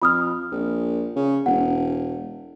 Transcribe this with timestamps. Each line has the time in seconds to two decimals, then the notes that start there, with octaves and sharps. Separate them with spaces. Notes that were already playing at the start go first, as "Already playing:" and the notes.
0.02 F2 B5 D#6 F6
0.52 A#1
1.16 C#3
1.46 E1 F#5